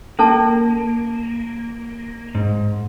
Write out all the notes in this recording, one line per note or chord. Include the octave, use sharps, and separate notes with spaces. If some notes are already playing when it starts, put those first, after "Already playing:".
A#3 C#4 A4 A5
G#2